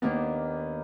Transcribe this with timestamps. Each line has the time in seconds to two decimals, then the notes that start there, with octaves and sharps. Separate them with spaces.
0.02 D#2 D#3 A#3 B3 D4